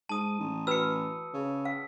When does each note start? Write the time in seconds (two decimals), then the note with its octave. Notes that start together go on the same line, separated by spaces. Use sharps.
0.09 G#2 A5 D#6 D#7
0.39 A1
0.67 F#4 B4 B5 E6 C#7
1.33 C#3
1.65 F5